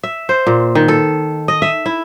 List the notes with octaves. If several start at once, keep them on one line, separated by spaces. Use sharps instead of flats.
E5
C5
A#2
D#3
A4
D#5
E5
E4